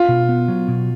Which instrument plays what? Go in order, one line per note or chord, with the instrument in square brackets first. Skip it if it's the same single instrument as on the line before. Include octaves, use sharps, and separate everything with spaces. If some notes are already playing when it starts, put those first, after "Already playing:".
Already playing: [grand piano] F4
[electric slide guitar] B2
B3
F#3
B2